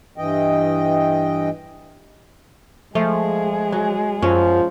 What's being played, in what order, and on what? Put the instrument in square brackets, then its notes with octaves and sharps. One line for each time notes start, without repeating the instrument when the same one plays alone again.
[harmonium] G2 E3 D#5 G5
[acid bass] F3 [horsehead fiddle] G#3 G#4 [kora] A3
[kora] F#3
[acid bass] F#2 [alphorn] F3 [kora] C#4